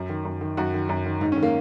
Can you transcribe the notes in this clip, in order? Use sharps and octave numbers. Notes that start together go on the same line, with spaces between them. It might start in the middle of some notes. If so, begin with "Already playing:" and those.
Already playing: F#2
D#3
F#2
D#3
F#2 F#4
D#3
F#2
D#3
G#2 D#4
C#4
D#3
A#3